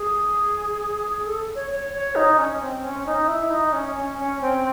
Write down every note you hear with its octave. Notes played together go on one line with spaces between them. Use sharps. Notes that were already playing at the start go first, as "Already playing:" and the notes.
Already playing: G#4
A4
C#5
C#5
C#5
D#4
C#4
C4
C#4
D#4
E4
D#4
C#4
C#4
C#4
C4